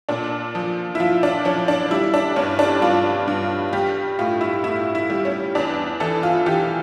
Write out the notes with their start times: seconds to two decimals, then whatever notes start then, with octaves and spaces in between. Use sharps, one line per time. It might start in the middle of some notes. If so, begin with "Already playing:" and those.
0.09 A#2 D4
0.55 F3
0.95 E4
1.00 F3 F4
1.23 D4
1.45 F3 C#4
1.68 D4
1.91 G3 E4
2.14 D4
2.36 G2 C#4
2.59 D4
2.82 G2 F4
3.28 G2
3.73 G3 G4
4.19 A2 F4
4.41 E4
4.64 A2 E4
4.95 E4
5.10 G3
5.25 C#4
5.55 E2 D4
6.00 E3 A4
6.23 F4
6.46 E3 G4